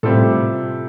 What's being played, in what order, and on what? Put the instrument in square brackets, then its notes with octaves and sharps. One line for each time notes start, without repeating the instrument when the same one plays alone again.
[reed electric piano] A2 [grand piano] C3 G3 C4 F4 A4